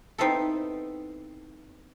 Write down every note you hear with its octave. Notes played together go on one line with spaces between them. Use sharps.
B3 C4 D#4 E4 A4